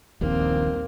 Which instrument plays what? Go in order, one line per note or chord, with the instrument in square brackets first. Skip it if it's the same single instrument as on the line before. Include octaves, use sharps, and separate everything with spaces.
[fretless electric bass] D#1 A#1 D#2 [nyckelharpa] A#3 C4